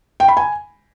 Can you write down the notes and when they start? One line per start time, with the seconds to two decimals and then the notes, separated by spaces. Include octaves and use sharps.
0.20 G5
0.28 B5
0.37 G#5